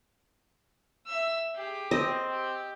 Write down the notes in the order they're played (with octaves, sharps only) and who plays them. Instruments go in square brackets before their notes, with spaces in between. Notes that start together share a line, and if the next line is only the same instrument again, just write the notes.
[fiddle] E5 E6
G4 G#4
[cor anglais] C4 [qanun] D#5
[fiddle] G4